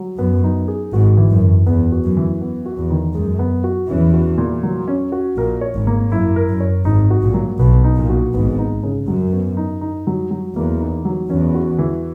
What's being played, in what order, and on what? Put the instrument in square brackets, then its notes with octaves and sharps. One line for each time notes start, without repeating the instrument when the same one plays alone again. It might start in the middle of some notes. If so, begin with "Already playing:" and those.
Already playing: [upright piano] F#3
[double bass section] F#2 [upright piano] B3
[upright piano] D#4
G#4
[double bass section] G#1 G#2 [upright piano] F#4
[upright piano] E3
[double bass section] F#2
[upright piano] E3
[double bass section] E2 [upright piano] B3
[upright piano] F#4
[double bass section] F#2
[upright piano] E3
B3
F#4
[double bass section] E2
[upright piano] D#3
[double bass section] F#2 [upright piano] G#3
[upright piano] B3
F#4
[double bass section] E2 E3 [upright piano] C#4
[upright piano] F#4
A#2
F#3
C#4
F#4
[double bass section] A#1 A#2 [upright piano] A#4
[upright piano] C#5
[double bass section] G#1 G#2
[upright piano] A#3
[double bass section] F#2 [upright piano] E4
[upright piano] A#4
[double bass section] F#2
[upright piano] C#5
[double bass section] G#1 G#2 [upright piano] D#4
[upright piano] F#4
[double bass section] A#1 A#2
[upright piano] F#3
[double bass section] B1 B2 [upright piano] B3
[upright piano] D#4
[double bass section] A#1 A#2
[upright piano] F#4
[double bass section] G#1 G#2 [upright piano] B3
[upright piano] D#4
C#3
[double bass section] F#2 [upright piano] F#3
[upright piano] B3
D#4
D#4
F#3
F#3
[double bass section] E2 [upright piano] A#3
[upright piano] D#4
F#3
[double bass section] E2 [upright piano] C#4
[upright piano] F#4
E3